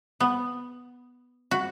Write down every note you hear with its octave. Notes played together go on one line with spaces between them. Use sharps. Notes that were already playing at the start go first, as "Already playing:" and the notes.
B3
F#4